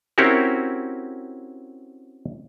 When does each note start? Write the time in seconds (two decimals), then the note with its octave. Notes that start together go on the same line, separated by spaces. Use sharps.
0.18 C4 C#4 E4 F#4 G4 A#4